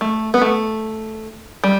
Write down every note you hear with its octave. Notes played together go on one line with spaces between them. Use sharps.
A3
B3
A3
G3